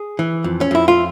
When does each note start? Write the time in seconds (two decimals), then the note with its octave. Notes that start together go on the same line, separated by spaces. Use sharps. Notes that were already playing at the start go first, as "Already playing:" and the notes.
Already playing: G#4
0.19 E3
0.44 F2
0.61 C#4
0.71 F2 E4
0.88 F4